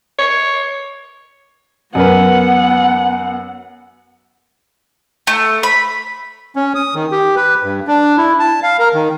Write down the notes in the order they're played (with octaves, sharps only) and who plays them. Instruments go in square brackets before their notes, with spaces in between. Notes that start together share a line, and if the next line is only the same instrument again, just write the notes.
[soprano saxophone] C#5
[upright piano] F#2 A#4 B4 [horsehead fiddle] B3 F#5
[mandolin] A3
B5
[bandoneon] C#4
D#6
D#3
G4
B4
G2
D4
E4
A5
F5
A#4
D#3